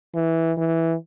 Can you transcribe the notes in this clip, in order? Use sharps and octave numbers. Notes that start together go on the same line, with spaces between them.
E3
E3